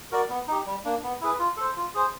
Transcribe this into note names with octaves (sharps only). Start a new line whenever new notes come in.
F#4 A#4 D5
B3
D#4 G4
G3
A#3 D4
B3
E4 G#4 B4
F4
A4 C5
F4
G#4 C5